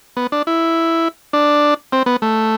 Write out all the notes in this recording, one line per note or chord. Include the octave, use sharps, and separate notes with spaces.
B3
D4
E4
D4
C4
B3
A3